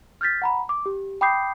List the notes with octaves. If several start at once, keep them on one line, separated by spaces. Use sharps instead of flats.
F6 G6 A6 B6
F#5 A#5 B5
D6
G4
G5 B5 D6 D#6 G6 C7